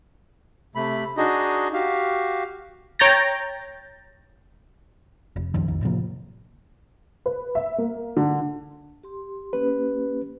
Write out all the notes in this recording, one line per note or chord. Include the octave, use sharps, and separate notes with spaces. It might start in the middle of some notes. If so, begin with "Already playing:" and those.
C3 A3 B5
D4 D#4 F#4 G#4 D#5
F#4 G4 F5
C#5 G5 A#5 G6 A6 A#6
F1
C#2 F#2 D#3 F3
B1 F2 D#3
A2 C3 F3 A#3
B4
E5
A#3
D3
G4 C6
A#3 C#4 G4 B4